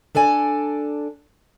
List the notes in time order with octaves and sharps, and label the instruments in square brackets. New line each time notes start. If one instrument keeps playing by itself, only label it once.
[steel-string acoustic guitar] D4 A4 D5 G#5